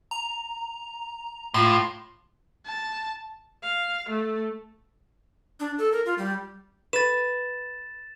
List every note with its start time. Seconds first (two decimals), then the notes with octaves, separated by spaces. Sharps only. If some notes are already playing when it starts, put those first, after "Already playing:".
0.11 A#5
1.54 A2 F4 F5 C6 D6
2.66 A5
3.63 F5
4.09 A3
5.60 D4
5.78 A4
5.92 A#4
6.06 F4
6.18 G3
6.93 B4 A6 E7